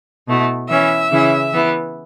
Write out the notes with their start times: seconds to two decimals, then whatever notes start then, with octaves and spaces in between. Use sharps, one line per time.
0.27 B2 A3 E4
0.69 E3 C#4 E4 E5
1.11 C#3 E3 C#4 E4
1.53 E3 B3 E4